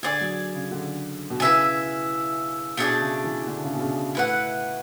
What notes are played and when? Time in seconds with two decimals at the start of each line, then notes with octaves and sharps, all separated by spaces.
0.03 D3 G#4 D5 G#5
0.21 F#3
0.55 C#3
0.71 D3
1.30 B2
1.40 C#3 E4 B4 E5 G#5
2.77 B2 A3 D4 G#4 D5
3.01 C#3
3.24 E3
3.47 D3
3.64 C#3
3.75 B2
3.80 C#3
4.15 A2 E4 B4 F#5